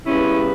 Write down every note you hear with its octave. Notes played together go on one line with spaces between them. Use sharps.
C#3 G3 B3 C#4 E4